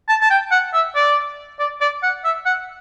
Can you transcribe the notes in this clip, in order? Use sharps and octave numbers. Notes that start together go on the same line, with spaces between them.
A5
A5
G5
F#5
E5
D5
D5
D5
F#5
E5
F#5